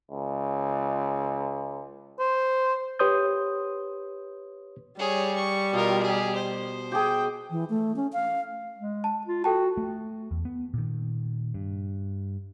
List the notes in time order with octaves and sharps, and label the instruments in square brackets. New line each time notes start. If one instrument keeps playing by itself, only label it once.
[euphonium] C#2
[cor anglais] C5
[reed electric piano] G4 B4 C#5 C6 D#6 G6
[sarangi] G3 [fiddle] G#4 C#5
[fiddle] C#6
[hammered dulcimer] B2 [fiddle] F4 A#4
[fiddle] G4 G#4
C5
[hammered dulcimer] G4 G#4 [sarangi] G5
[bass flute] E3
A3
C#4
F5
[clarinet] G#3
[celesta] A5
[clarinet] F4
[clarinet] F#4 [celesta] A4 G5 A5
[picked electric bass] A3
E2
B3
A#2 D#3
G2